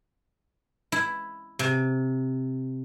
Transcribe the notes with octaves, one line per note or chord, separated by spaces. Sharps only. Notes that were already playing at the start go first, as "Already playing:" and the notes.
E4
C3